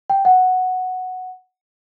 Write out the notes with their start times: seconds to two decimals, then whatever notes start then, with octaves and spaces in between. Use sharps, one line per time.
0.10 G5
0.25 F#5